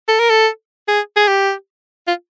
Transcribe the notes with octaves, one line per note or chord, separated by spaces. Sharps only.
A4
A#4
A4
G#4
G#4
G4
F4